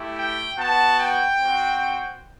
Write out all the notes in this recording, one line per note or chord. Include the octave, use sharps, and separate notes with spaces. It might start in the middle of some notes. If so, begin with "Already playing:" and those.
Already playing: A3 E4 G4
G5
B3 F#4 A5
G5
C4
F#4